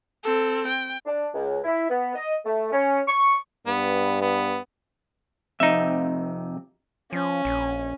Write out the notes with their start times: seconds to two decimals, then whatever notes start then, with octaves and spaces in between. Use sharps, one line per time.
0.24 C4 A4
0.68 G5
1.06 D4
1.34 C#2
1.64 E4
1.90 B3
2.15 D#5
2.45 A3
2.72 C#4
3.08 C#6
3.67 G2 B3
4.22 B3
5.60 F2 C3 D#4 E5
7.13 F3 C#4
7.45 A#1